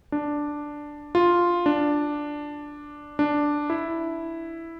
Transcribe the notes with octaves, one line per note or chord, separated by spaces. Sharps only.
D4
F4
D4
D4
E4